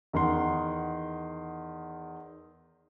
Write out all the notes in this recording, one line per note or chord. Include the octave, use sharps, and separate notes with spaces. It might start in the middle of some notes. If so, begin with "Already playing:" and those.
E2 D#3 F#5 C6